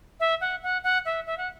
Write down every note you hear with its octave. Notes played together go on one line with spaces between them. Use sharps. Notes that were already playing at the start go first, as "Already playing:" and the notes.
E5
F#5
F#5
F#5
E5
E5
F#5